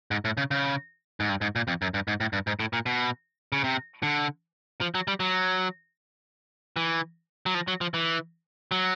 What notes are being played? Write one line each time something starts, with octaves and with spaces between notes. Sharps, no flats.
G#2
A2
C#3
C#3
G#2
G2
G#2
A#2
F2
F#2
G2
G#2
A2
G2
G#2
A2
A#2
B2
C#3
C3
D3
F3
F#3
G3
F#3
E3
F#3
F3
F#3
F3
E3
F#3